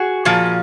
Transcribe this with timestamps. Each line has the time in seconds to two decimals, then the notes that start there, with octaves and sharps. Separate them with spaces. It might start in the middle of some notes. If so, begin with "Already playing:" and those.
Already playing: F#4 G#4
0.25 A#2 F3